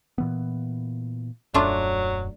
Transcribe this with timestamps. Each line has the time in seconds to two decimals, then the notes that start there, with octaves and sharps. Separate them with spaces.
0.18 A#2 E3 B3
1.54 D#1 F#2 F#3 A3 D4 F4